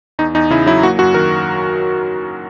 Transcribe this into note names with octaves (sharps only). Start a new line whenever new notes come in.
E2 D#4
E2 D#4
C#3 E4
F#3 E4
A#3 F#4
F#2 F#4
D#3 A#4